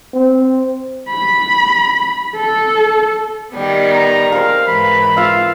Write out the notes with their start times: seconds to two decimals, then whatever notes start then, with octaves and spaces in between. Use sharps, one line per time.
0.14 C4
1.10 B5
2.36 A4
3.52 D#3 G3 B3
3.92 A#5
4.32 A#4 C5 F5
4.67 G#2 E3 B5
5.17 F4 E5 F5